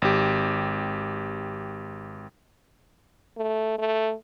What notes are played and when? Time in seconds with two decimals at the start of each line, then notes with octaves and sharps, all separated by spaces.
0.02 G#1 G4
3.37 A3
3.79 A3